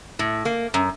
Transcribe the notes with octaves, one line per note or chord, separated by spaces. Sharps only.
A2
A#3
F#2